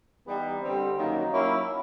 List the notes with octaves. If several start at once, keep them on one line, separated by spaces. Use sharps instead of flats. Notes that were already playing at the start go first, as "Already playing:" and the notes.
E3 G3 B3 D#4 G4
D3 G3 C4
F#2 D#3 F#3 A#3 D#4
F#3 A#3 C#4 E4